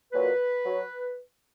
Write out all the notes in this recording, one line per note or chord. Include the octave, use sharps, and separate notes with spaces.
A#2 F#3 B4
F#3